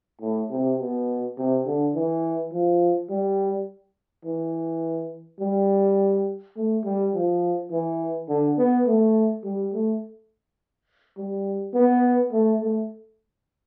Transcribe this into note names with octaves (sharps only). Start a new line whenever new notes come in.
A2
C3
B2
C3
D3
E3
F3
G3
E3
G3
A3
G3
F3
E3
D3
B3
A3
G3
A3
G3
B3
A3
A3